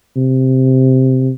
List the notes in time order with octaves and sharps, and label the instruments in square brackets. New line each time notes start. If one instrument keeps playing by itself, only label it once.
[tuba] C3